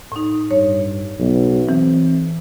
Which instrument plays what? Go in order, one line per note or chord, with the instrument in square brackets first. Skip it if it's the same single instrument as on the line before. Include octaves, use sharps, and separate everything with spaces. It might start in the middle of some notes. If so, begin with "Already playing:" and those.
[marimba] A2 D#4
[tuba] G2 [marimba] C#5
[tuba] B1
[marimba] E3 [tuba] C4